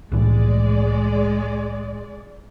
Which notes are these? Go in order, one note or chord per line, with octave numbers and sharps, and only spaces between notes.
C2 A2 E3 G#3 D5